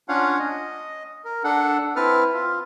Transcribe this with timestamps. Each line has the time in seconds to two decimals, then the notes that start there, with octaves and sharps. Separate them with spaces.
0.09 C#4 D4 F4 C#5 F5 F#5
0.39 D#5
1.25 A#4
1.44 D4 A4 F#5
1.96 C4 E4 B4 A5 F6
2.34 F4